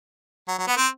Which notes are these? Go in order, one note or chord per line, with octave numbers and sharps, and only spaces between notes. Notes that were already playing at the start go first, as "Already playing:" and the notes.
F#3
F#3
B3
C4